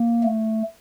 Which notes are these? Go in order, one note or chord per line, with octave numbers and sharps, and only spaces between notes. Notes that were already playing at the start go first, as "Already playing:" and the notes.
Already playing: A#3
A3